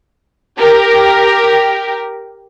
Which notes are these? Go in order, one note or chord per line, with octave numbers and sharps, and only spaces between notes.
G4 A#4